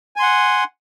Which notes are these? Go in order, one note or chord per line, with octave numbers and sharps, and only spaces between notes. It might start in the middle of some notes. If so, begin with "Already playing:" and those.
F#5 G#5 C6